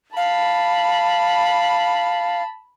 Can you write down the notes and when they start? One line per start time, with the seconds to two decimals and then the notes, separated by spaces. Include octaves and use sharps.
0.17 F5 A5 B5